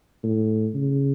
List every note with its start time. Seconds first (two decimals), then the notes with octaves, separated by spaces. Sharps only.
0.23 A2
0.75 C#3